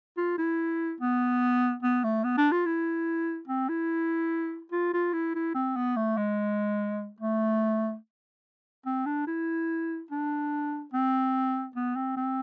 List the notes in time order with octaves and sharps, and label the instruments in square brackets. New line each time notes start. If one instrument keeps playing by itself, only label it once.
[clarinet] F4
E4
B3
B3
A3
B3
D4
F4
E4
C4
E4
F4
F4
E4
E4
C4
B3
A3
G#3
A3
C4
D4
E4
D4
C4
B3
C4
C4